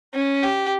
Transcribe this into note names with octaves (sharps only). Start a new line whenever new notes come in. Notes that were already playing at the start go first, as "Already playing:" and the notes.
C#4
G4